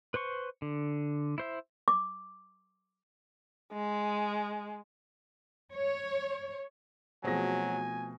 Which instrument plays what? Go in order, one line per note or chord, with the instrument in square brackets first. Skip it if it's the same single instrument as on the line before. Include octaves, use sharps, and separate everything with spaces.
[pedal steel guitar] B4 C5 C6 C#6
D3
E4 C5 E5
[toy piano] D6
[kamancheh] G#3
[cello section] C#5
[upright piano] B2 G#4 A#6 [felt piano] F3 A3 C4 [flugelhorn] F#3 [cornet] G#5